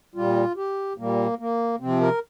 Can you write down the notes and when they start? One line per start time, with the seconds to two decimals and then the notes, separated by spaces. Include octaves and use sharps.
0.15 A#2 G3 F4
0.56 G4
0.98 A#2 G3 A#3
1.39 A#3
1.80 C3 F3 C4
2.01 A#4